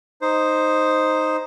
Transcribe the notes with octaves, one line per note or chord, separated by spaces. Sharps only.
D#4 C5